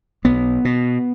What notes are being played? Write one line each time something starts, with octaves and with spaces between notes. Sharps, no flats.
B1 B3
B2